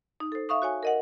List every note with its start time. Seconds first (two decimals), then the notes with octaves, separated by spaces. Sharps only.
0.20 D#4
0.32 A4 C5
0.49 E5 F5 C#6 D#6
0.62 F#4 C#5 G#5
0.83 A#4 D#5 F#5